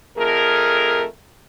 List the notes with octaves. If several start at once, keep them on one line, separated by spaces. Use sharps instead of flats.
F2 A3 G#4 A#4